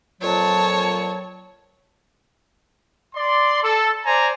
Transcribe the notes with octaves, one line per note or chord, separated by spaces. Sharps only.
F2 A#2 F#3 C#5 A5
D5 C6
A4
C5 D5 G#5 A#5